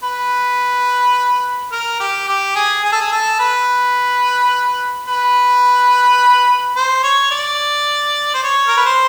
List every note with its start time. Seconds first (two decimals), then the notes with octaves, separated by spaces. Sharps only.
0.04 B4
1.72 A#4
2.00 G4
2.28 G4
2.56 G#4
2.84 G#4
2.92 A4
3.01 G#4
3.12 A4
3.39 B4
5.08 B4
6.76 C5
7.03 C#5
7.31 D5
8.35 C5
8.44 C#5
8.68 A#4
8.77 B4
8.86 C5